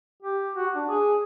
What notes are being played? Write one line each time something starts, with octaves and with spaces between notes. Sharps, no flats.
G4
F#4
D4
G#4